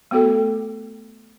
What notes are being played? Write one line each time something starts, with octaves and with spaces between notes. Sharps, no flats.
A3 B3 F#4 A4 G5